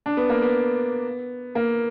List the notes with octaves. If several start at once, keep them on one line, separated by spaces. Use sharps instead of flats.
D4
B3
A#3
B3
A#3